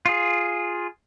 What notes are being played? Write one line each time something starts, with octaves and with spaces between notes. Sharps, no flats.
F4 G#4